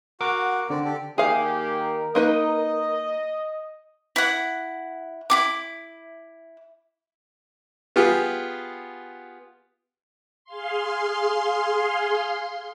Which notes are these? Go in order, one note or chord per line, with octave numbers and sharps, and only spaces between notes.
F#4 A#4 F#5 D6
D3 C4 D5
G4 A4 D5
D#3 A#3 G4 G#4 A#4 F5
A#3 D#4 B4 D#5
E4 F#5
E4 F4 D6
B3 F4 G4 G#4
G#4 F5 C6